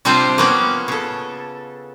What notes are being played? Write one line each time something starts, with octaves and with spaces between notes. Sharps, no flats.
C3 G3 C4 D4 F4 C5
A#3 B3 C#4
C#3 A4